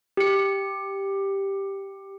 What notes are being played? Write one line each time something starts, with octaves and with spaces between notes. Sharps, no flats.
G4 C#7